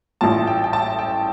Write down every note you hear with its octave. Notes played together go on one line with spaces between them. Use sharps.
A1 A2 G3 F4 A5
G5
G5
A5
G5